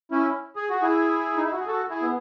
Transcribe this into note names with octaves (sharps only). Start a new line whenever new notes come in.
C#4 E4
G#4
F#4
E4 G#4
D#4
E4
F#4
G#4
F#4 A4
E4 G#4
B3